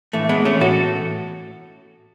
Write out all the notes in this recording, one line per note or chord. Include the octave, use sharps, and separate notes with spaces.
A2 E3 A3
G#3 B3
A3 C#4
A2 E3 F#4 A4